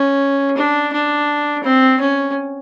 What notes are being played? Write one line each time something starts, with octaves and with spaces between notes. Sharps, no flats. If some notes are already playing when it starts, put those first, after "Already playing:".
Already playing: C#4
D4
D4
C4
C#4